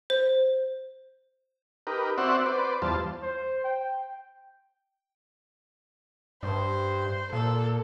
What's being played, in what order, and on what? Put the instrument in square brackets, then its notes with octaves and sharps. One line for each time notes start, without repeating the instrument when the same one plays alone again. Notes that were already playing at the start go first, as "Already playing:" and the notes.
[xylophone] C5
[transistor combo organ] D#4 G4 A#4 B4
C4 F#4 C5 D5 E5 F#5
B4 C5 D5
E2 G3 F4 C5 A5
[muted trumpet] C5
G5
[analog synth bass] G2 [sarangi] C5
[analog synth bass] A#2 [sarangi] A4